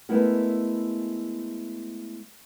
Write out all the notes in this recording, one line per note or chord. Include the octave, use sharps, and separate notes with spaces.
G#3 A3 B3 E4 A#4